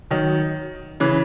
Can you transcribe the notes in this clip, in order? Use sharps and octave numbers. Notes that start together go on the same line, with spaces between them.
D#3 F#3
C#3 E3